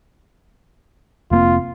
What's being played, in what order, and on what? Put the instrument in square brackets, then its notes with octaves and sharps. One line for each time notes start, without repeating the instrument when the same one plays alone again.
[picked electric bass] F1 A#3 C4 [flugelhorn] F4